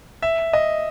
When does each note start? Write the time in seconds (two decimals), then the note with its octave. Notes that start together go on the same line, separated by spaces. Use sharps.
0.22 E5
0.53 D#5